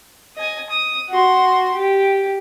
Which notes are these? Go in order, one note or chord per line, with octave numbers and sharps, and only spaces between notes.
D#5 G#5
D#6
F#4 C6
G4